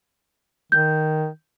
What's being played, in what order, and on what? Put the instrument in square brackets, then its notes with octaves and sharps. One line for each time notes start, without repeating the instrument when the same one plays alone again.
[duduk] D#3 [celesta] G6